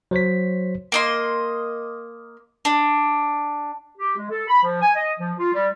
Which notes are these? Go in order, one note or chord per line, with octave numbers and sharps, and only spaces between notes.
F#3 C5 C#5 B6
A#3 D#5 C6
D4
G4
G#3
A4
B5
F3
G#5
D#5
F3
F4
G3